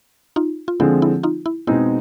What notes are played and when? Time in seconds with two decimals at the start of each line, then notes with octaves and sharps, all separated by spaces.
0.36 D#4 F4
0.68 F4
0.80 D3 F3 G#3 C4 E4
1.02 E4
1.23 D#4 F4
1.46 E4
1.67 B2 G#3 C4 D#4 E4 G#4